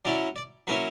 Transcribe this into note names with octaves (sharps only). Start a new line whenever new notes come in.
F#3 C#4 E4 D5
D5
F#3 A#3 C#4 E4 B4